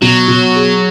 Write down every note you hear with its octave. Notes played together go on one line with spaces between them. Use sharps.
B2 F#3
B2
G#4